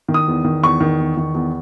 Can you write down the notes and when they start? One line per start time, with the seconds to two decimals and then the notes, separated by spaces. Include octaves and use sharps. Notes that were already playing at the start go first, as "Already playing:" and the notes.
0.08 D#3
0.14 D#6
0.28 E2
0.45 D#3
0.63 E2 C#6
0.80 D#3
0.99 E2
1.17 D#3
1.35 E2